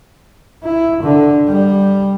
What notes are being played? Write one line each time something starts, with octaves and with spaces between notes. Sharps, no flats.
E4
D3
G3